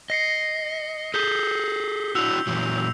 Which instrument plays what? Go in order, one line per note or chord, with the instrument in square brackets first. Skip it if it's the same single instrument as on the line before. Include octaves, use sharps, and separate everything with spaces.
[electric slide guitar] D#5 [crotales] A#6 C7 C#7
[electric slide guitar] G#4 A4 [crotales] G6 B6 G7
[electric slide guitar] D4 E4 F#4 [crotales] E6 F7
[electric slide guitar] A#2 E3 F#3